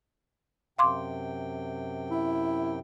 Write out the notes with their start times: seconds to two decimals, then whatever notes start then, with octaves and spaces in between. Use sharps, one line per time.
0.79 F#2 C3 F5 G5 C6 D6
2.11 E4